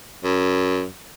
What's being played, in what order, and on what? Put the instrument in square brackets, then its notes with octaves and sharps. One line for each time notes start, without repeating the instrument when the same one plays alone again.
[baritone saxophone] F#2